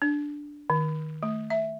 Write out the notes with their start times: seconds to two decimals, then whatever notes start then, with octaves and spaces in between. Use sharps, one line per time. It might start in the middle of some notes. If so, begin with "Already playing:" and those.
0.02 D4
0.70 D#3
1.23 A3
1.50 E5